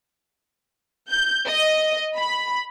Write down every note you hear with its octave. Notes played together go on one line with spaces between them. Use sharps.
G6
D#5
B5